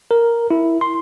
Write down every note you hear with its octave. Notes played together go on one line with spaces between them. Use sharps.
A#4
E4
C6